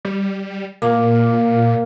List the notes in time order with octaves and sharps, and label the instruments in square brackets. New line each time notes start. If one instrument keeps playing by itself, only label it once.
[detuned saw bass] G3
[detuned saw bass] A#2 [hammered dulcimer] A#3